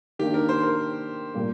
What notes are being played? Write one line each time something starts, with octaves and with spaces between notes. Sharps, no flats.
D#3 A#3 D4 G4
A#4
C5
A#4
A#2 G3 A#3